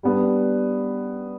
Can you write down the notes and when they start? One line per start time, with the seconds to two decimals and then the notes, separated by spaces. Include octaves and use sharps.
0.03 G3 B3 D4